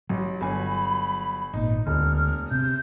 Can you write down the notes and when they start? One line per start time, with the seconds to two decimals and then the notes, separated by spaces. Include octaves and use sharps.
0.09 A1 F#3
0.41 G1 G#5 B5
1.54 G#1 A#2 D#4
1.87 E1 D2 F6
2.51 C3 G6